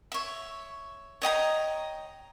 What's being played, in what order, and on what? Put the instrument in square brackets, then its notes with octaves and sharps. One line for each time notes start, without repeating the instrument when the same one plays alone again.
[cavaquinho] C#5 E5
C#5 D#5 G5 A#5